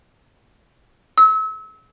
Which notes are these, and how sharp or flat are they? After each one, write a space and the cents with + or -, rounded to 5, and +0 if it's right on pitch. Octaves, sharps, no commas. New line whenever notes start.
E6 -35